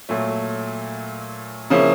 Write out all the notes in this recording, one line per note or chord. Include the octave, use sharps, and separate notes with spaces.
A#2 F#3 A3
C#3 F3 A#3 C#4 E4